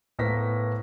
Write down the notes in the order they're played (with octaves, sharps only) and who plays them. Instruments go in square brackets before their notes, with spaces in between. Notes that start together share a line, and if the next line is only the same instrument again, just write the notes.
[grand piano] A2 A#3 B3 C5 A#6 B6